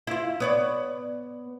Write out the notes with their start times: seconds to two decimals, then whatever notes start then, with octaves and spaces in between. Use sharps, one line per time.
0.07 E4 F4
0.40 B3 C#5 D5